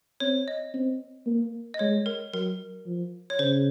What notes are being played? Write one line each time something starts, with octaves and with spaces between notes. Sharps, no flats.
C4 C#5
D#5
C4
A#3
D#5
G#3 C#5
A#4
F#3 A#4
F3
C#5
C#3 C5